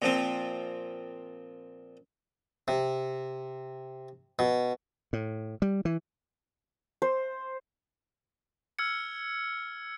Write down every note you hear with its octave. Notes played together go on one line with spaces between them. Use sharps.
A#2 F3 C4
C3
B2
A2
G3
E3
C5
E6 F6 G#6 C#7